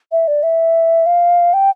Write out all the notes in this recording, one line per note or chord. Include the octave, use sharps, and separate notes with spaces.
E5
D5
E5
F5
G5